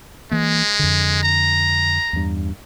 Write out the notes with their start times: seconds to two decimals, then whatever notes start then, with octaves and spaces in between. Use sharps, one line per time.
0.31 E3 G#3 A#3
0.79 F2 D3
1.23 A#5
2.13 E2 G2